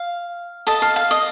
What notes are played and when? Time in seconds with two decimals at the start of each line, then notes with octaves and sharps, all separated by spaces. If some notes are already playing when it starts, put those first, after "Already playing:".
Already playing: F5
0.67 A4 D#5 A5
0.82 F5
0.96 F5
1.11 D#5